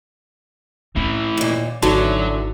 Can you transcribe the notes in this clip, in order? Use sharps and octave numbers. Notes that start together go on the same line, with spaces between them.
A2 E3 C4 D#4
D#2 A#2
G#1 E2 D3 F#3 D#4 F#4 A5